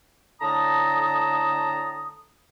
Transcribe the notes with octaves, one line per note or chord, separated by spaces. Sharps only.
A2 D3 A5 A#5 D#6